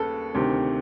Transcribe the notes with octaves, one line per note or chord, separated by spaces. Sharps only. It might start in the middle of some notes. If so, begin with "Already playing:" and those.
Already playing: D#2 C#3 A4 B4
D2 C3 D#3 G4